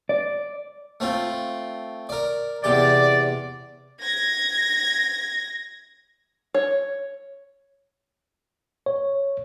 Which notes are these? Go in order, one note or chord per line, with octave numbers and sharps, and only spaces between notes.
D5
A3 C4 F4
A#4 D5
E2 C3 G4 D5
G#6 A#6
C#5
C#5